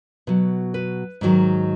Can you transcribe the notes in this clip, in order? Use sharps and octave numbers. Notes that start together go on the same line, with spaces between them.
B2 F#3
B4
G#2 D#3 F#3